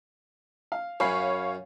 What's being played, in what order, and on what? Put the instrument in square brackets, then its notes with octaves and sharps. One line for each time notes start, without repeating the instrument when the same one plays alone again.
[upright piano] F5
[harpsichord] F#2 [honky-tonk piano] C#5 F5 [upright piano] G#5 B5 C7